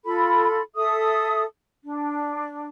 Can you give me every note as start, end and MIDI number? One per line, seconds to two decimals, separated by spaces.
0.05 0.61 65
0.05 0.61 69
0.05 0.61 83
0.75 1.44 69
0.75 1.44 76
0.75 1.44 87
1.83 2.69 62